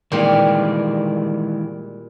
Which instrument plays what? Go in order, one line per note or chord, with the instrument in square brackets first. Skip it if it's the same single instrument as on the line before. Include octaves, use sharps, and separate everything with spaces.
[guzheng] A#2 G3 [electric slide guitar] D#3 E3 G#3